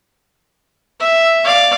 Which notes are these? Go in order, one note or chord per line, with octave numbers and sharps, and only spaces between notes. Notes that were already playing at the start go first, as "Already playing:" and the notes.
E5
D5 F5